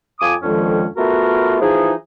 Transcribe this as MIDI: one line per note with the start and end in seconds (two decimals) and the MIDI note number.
0.19 0.34 41
0.19 0.34 65
0.19 0.34 80
0.19 0.34 86
0.19 0.34 87
0.43 0.85 41
0.43 0.85 50
0.43 0.85 51
0.43 0.85 53
0.43 0.85 56
0.43 0.85 61
0.96 1.56 57
0.96 1.56 59
0.96 1.56 65
0.96 1.56 66
0.96 1.56 70
1.61 1.93 52
1.61 1.93 53
1.61 1.93 63
1.61 1.93 68